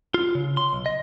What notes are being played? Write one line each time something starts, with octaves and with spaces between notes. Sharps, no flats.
F4
C#3
C6
B1
D#5